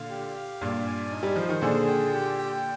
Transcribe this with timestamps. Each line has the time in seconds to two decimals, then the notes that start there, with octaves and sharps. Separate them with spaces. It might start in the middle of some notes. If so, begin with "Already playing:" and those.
Already playing: A#2 D3 F5
0.10 G4
0.35 F5
0.61 G2 A#2 D5
0.86 G#5
1.11 D#4
1.23 G3
1.36 F3 C5
1.49 D#3
1.61 A#2 D3 G#4
1.88 G5
2.13 G4
2.38 G5